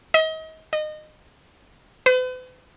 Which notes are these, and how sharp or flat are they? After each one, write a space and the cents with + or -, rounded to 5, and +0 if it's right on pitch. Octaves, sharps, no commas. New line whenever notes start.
D#5 +35
D#5 -25
B4 +45